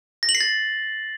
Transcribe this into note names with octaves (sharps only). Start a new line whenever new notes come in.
A#6
F#7
C7
A6